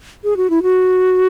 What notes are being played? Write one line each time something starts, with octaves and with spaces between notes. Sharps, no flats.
G#4
F#4
E4
F#4